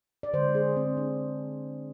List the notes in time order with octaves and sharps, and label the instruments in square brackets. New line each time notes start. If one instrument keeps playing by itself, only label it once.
[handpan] D5
D3 C5
G#3
G#4
C4
D4